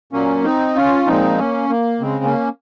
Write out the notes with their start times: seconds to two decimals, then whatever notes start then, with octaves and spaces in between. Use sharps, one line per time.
0.13 A#2 F#3 A#3 C#4
0.44 C4 D#4
0.76 C#4 F4
1.06 A#2 F3 G#3 C4 D#4
1.38 A#3 C#4
1.69 A#3
2.01 C#3 G#3 C4
2.24 A#3 C#4